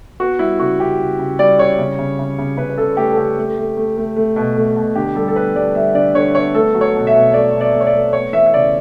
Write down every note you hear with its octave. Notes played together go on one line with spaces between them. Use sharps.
B3 F#4
G3 E4
C#3 F#4
C#3 G4
C#3
C#3
G3 D5
C#3 C#5
C#3
C#3
C#3
C#3
C#3 B4
B4
C#3 A4
A3 G4
A4
C#3 G4
A3
A3
A3
A3
A3
B2
A3
B2
D3 G4
G3 A4
A4
B3 B4
G3 D5
G3 E5
D3 D5
D3 C#5
B3 C#5
A3 A4
F#3
C#5
B2
E5
B2
A3 D5
B2
D5
A3
C#5
D5
A3
B3 C#5
E3 E5
E5
C#3 D5